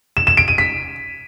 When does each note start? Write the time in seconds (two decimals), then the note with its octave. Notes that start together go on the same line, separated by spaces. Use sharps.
0.17 E7
0.27 E7
0.37 D7
0.48 D#7
0.58 B6